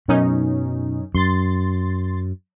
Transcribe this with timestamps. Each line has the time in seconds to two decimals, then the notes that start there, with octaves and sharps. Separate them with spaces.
0.08 F#2 B2 C#4 D#4
1.15 F#2 C6 A6